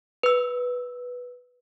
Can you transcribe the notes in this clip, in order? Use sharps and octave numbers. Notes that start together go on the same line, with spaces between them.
B4 E6